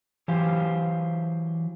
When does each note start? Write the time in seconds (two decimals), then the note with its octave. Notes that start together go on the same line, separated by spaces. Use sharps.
0.28 E3 F#3 G4 C5 F5 G#5